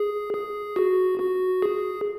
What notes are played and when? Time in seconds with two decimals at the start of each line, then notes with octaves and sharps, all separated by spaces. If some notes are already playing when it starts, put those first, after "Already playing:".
Already playing: G#4
0.33 G#4
0.76 F#4
1.20 F#4
1.62 G#4